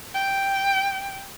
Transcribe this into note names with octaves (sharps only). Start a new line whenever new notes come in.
G5